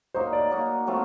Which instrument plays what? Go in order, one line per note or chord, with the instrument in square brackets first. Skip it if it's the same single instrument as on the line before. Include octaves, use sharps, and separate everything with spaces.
[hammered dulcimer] F#3 A#3 D#4 F#4 [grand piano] C5
[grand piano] D5
[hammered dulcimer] F#3 A#3 D#4 F#4
F#3 A3 C4 F4